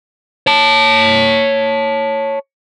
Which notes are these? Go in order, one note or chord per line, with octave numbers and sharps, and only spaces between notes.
C#5 A5